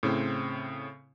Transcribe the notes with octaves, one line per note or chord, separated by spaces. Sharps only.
A2 C#3 C4